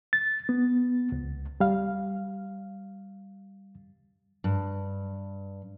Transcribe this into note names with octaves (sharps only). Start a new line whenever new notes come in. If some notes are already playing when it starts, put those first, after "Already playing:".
A6
B3
C#2
G3 F5
G2